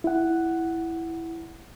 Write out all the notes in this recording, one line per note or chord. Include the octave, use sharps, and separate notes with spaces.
E4 F#5